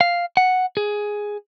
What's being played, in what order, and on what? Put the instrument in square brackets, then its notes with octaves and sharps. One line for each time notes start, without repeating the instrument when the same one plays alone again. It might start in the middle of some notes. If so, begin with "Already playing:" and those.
[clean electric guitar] F5
F#5
G#4